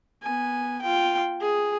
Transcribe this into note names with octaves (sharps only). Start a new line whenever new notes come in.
B3 G#5
F4 G5
G#4